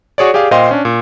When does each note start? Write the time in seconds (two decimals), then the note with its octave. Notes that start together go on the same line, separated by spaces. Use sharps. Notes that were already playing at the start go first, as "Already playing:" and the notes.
0.18 F#4 G#4 C#5 D5
0.34 G4 G#4 D5 F5
0.51 A#2 C5 D#5 F5 G5 C6
0.71 C#4 D4
0.85 A#2